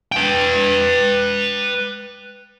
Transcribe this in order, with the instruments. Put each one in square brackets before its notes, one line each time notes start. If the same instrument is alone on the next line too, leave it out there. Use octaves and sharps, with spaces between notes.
[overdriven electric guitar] B4 G5